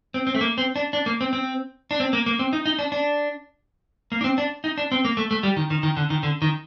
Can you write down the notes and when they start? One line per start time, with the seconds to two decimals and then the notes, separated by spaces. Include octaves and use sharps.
0.14 C4
0.27 C4
0.35 A3
0.41 A#3
0.58 C4
0.76 D4
0.93 D4
1.06 A#3
1.21 C4
1.33 C4
1.91 D4
2.00 C4
2.13 A#3
2.26 A#3
2.39 C4
2.53 D#4
2.66 D#4
2.79 D4
2.92 D4
4.12 A#3
4.21 D4
4.24 C4
4.38 D4
4.64 D#4
4.78 D4
4.92 C4
5.05 A#3
5.17 A3
5.31 A3
5.43 G3
5.57 D#3
5.70 D#3
5.83 D#3
5.97 D3
6.10 D#3
6.23 D3
6.42 D#3